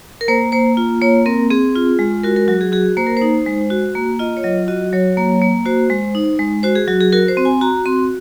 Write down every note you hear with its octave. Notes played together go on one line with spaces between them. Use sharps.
A#4
A#3 C5
A#3 C5
F4
A#3 C#5
C4 A#4
C4 G#4
F4
G#3
F#4 A#4
A#4
F#3 F#4
G#4
F#4 G#4
A#3 C5
A#4
D#4 C5
G#3
F#4
A#3
F4 D#5
C#5
F#3 D#5
F#4 D#5
F#3 C#5
A#3
A#3
F#4 C5
G#3
D#4
G#3
F#4 C5
G#4
F#3 F#4
G#4
F#4 A#4
C5
C4
G#5
F#4 A#5
C4 C6